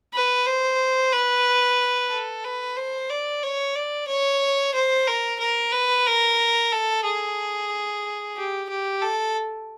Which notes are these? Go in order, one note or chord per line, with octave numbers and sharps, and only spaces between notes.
B4
C5
B4
A4
B4
C5
D5
C#5
D5
C#5
C5
A#4
A#4
B4
A#4
A4
G#4
G4
G4
A4